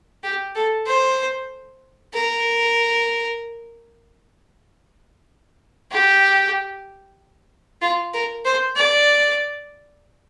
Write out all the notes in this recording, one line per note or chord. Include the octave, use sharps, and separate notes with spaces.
G4
A4
C5
A#4
G4
F4
A#4
C5
D5